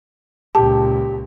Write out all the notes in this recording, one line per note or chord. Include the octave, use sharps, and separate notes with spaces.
C#2 A#2 G4 A5